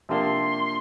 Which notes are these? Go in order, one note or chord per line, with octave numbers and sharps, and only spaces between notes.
C3 F3 A#3 D4 G4 C6